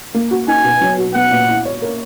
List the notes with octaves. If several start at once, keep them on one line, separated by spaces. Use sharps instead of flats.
A#3
F#4
D#4 G#5
B2
F#3
F#4
B3 F#5
A#2
E4
C#5
A#4